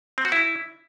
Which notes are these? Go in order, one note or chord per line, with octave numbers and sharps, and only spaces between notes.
C4
F#4
E4